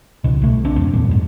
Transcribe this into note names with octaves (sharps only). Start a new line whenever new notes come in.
C#2 B2
C2 A3
B1 C4 D4
F2
E2 G2 A#2
G#2